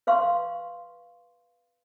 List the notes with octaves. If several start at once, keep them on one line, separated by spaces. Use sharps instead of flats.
B4 F5 C6 C#6